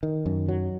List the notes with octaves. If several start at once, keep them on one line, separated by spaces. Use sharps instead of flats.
D#3
F#2
F#3